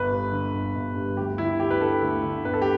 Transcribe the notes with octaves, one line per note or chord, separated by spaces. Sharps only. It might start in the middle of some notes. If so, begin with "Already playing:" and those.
Already playing: G1 B4
G2
D3
G1
G1
G2
D2 G4
D3 E4
D2 G4
B4
D3 A4
D2
D3
G1 B4
A4
G4